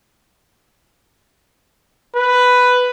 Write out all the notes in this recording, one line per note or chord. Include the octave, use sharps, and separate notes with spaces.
B4